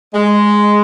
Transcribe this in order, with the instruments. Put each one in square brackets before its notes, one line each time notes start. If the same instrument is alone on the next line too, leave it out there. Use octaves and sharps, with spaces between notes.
[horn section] G#3